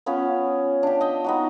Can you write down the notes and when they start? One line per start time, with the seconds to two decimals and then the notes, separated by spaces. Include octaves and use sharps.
0.06 B3 C#4 F4 C#5
0.83 D4 G4
1.01 D#5 G5
1.24 B3 D#4 F#4